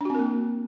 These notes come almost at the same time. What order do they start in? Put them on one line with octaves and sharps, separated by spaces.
D4 F#4 C4 A#4 A#3